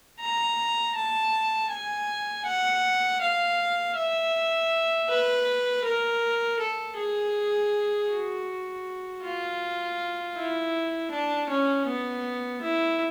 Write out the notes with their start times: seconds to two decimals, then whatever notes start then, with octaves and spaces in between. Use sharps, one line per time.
0.20 A#5
0.95 A5
1.70 G#5
2.45 F#5
3.21 F5
3.96 E5
5.09 B4
5.84 A#4
6.59 A4
6.96 G#4
8.10 F#4
9.23 F4
10.36 E4
11.11 D4
11.49 C#4
11.86 B3
12.62 E4